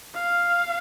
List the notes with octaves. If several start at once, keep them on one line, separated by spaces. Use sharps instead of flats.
F5